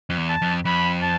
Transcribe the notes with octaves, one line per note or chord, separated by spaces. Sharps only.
F2
E2
A5
F2
F2 B5
A5